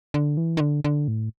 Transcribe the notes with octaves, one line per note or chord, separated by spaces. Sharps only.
D3
E3
D#3
D3
D3
A2